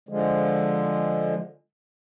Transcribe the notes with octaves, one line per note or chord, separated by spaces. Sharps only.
D3 F3 G#3